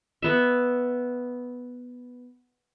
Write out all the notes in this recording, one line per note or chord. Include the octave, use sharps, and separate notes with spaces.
B3 E5